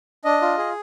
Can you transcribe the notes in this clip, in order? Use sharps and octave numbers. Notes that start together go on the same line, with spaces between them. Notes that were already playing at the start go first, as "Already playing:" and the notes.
D4 D#5
F4
G#4